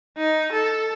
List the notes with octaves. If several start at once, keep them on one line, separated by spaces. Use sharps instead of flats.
D#4
A4